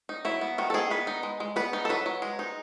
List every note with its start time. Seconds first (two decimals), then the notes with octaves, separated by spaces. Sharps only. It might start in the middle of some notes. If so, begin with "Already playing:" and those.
0.09 D#4
0.25 F#3 E4
0.41 B3
0.58 D#3 F#4
0.70 A4
0.74 D#3 G#4
0.90 B3 B4
1.07 D#4
1.23 G#3
1.40 G#3
1.56 B3 B4
1.73 D#4
1.85 A4
1.89 F#3 B4
2.06 F#3
2.22 G#3
2.39 D#4